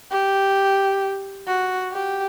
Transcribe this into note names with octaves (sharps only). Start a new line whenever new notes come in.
G4
F#4
G4